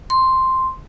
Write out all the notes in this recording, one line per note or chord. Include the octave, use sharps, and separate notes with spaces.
C6